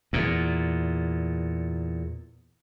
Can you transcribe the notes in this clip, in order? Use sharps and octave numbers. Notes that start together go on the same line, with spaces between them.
E2 A#2